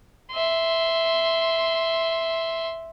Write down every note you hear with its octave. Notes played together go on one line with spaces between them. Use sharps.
E5 C6